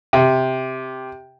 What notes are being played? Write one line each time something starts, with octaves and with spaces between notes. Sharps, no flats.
C3